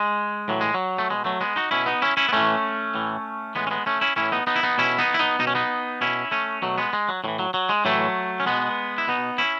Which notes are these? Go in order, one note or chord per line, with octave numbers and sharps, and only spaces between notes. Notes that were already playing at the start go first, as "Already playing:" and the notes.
Already playing: G#3
A2 E3 F#3
G#3
F#3
A3
B2 G#3
F#3 A3
G#3 B3
D#4 F#4
B2 C#4 E4
B3 D#4
C#4 E4
C#4 E4
B3
A2 E3 A3 C#4
A2 E3
A2 E3 G#3 B3
C#4
G#3 B3
A3 C#4
C#4 E4
A2 E3 C#4 E4
B3 D#4
B3 D#4
E4
B3 D#4
B2 C#4 E4
B3 D#4
E4
B3 D#4
B2 D#4
C#4
B3 D#4
B2 C#4 E4
A3 C#4
B2 F#3 A3
G#3 B3
G#3
F#3
A2 E3 F#3
F#3
F#3
G#3
A2 E3 F#3 A3
C#4
B2 G#3 B3
E4
B2 B3 D#4
C#4 E4